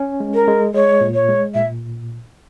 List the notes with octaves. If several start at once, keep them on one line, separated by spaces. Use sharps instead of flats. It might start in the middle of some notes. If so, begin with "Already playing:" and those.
Already playing: C#4
G#3
A#4
G#3
G#3 C#5
A#2
C#5
G#3
A#2 E5